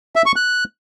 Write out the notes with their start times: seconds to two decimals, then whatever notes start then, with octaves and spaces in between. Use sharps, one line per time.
0.16 E5
0.26 C#6
0.36 F#6